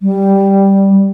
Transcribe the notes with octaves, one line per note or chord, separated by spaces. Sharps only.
G3